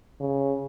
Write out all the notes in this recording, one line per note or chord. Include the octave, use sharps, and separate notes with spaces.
C#3